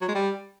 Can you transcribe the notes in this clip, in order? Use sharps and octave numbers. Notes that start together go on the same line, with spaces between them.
F#3
G#3
G3